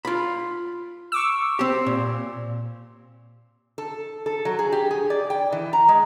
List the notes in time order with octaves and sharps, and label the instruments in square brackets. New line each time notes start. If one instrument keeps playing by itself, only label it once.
[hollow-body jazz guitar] F4 B5
[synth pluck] C#6 D6 E6
[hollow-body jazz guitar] C4 G4
A#2
[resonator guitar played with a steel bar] A4
A4
F#3
G#4
G4
G#4
D5
G5
E3
A#5
G#3